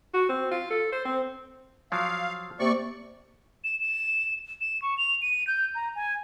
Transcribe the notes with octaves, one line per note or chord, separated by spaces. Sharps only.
F#4
C4
F4
A4
C5
C4
F3 F#3 F5
C3 A#3 D5 C#6
E7
E7
E7
C#6
F7
D#7
G6
A#5
G#5